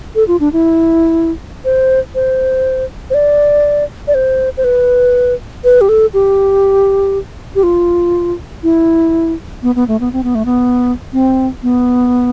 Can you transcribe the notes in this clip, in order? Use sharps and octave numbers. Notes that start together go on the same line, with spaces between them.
A4
F4
D4
E4
C5
C5
C5
D5
D5
C5
C5
B4
B4
G4
A4
G4
G4
F4
E4
B3
B3
A3
B3
C4
B3
A3
B3
C4
B3